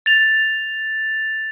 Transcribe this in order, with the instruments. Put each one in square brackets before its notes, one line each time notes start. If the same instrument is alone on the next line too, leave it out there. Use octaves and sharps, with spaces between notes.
[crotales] A6 F7